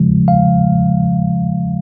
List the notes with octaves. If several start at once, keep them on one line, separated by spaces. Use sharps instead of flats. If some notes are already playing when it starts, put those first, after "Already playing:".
Already playing: C#3 F3 G#3
F5